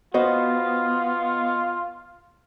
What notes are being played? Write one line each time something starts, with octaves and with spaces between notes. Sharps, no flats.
B3 F4 F#4 C5 D#5